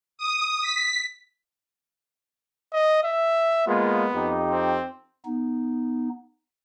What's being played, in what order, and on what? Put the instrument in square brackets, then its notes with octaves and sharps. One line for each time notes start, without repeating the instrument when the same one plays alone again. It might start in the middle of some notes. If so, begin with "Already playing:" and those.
[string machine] D#6
B6
[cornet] D#5
E5
[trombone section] G#3 A#3 F4 [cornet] B3
[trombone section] F2 D#4 G4
[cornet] C4
[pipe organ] B3 D#4